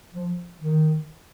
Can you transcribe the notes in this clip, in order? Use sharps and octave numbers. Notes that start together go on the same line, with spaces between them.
F3
D#3